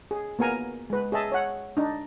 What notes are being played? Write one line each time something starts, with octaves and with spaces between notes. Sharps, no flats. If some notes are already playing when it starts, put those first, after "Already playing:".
G#4
A#3 B3 A#4 G#5 A#5
G#3 B4
G#4 D#5 E5 A5
C#5 F#5
D4 D#4